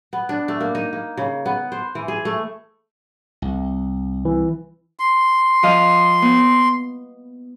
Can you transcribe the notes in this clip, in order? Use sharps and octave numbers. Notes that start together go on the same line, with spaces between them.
B3
D4
A3
A#3
D#4
A#3
C#3
B3
C5
E3
G#4
A3
C2
E3
C6
F3 D#5 F5
B3